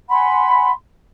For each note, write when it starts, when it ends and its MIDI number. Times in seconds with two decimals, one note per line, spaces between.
0.09 0.72 78
0.09 0.72 80
0.09 0.72 83
0.09 0.72 84